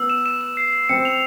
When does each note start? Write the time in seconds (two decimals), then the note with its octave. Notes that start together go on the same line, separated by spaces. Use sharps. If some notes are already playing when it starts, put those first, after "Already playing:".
Already playing: B3 E6
0.10 E7
0.26 E7
0.41 E7
0.57 C7
0.73 C7
0.89 C4 C#7
1.05 F7